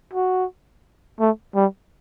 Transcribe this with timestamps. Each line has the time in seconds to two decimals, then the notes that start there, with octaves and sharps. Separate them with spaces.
0.14 F#4
1.20 A3
1.55 G3